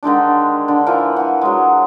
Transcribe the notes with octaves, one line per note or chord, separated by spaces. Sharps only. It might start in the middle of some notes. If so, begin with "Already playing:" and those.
D3 D#3 G#3 D4
D3
E3 F3 A#4
F#5 G#5
F#3 G#3